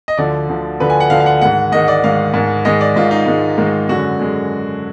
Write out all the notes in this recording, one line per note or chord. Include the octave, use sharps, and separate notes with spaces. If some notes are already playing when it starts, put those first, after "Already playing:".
D#5
D2 D3 F3 D5
D2 D3 F3
D2 D3 F3 B4
G#5
F#5
D2 D3 F3 F5
F5
F#5
G#2 D#3 G#3 F#5
G#2 D#3 G#3 D#5
D5
G#2 D#3 G#3 F5
G#2 D#3 G#3
G#2 D#3 G#3 D#5
D5
G#2 D#3 G#3 F4
D#4
G#2 D#3 G#3
G#2 D#3 G#3
F#2 D3 G#3 F#4
F#2 D3 G#3